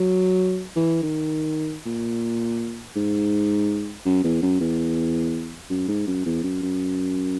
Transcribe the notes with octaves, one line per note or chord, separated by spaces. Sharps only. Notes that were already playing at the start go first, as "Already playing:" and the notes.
Already playing: F#3
E3
D#3
A#2
G#2
F#2
E2
F#2
E2
F#2
G#2
F#2
E2
F#2
F#2